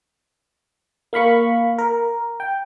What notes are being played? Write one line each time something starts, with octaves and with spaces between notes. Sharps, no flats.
A#3 F5 B5 C#6
A#4
G5